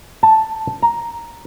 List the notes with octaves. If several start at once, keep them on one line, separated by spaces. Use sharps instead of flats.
A5
A#5